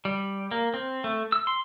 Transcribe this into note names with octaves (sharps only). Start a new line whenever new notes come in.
G3
A#3
C4
A3
E6
C6